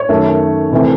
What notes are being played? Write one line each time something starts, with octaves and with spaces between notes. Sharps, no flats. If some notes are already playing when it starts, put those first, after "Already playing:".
Already playing: C#5
F#2 D#3 A3
C2 C3 E3 A3